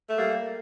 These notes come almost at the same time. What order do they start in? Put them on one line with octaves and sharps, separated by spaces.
A3 A#3 G3